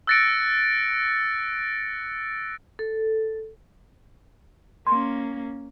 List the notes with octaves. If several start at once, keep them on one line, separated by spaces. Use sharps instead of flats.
E6 F#6 A6 A#6 C#7 D7
A4
A#3 C#4 C6